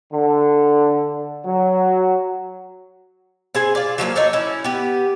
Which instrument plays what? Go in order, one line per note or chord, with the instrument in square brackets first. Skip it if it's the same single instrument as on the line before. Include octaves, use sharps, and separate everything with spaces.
[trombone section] D3
F#3
[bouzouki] C4 G#4 G#5
F4 D5
F3 F#3 G#3 A#3
D#4 A4 C#5 D5
C#4 E4
B3 G4